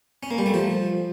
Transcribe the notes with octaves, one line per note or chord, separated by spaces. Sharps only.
C#4
A#3
G3
A3
F3